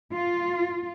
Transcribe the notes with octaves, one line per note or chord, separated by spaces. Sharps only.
F4